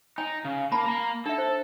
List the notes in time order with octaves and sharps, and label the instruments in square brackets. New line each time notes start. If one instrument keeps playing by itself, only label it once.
[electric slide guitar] D#4 [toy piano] G#5
[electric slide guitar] C#3
[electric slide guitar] A#3 [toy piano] A5 B5
[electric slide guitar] A#3 A#5
[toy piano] D4 E5 [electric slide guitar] A4
[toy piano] C5